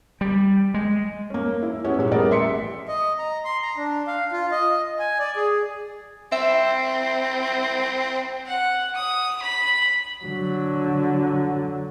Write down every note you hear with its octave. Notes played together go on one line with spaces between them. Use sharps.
G3
G#3
A#3 C#4
E4
B3 C#4 E4 G4 B4
A#2 G3
A1 G3 B3 G#4 A#4 D5
A1 E5 C6 B6 C#7
D#5
A#5
C6
A#5
D4
F5
F4
D#5
G#5
D5
G#4
C4 E5
F#5
D#6
B5
D3 F#3